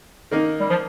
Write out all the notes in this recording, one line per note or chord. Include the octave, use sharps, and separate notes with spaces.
D#3 A#3 D#4
G3
F3